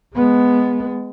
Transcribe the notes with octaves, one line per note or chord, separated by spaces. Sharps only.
G#3 B3